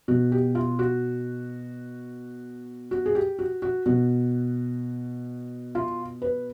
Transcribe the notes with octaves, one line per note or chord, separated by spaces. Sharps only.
B2 F#4
G4
F4
F#4
F#4
G#4
G4
F#4
F#4
B2 F#4
F4
B4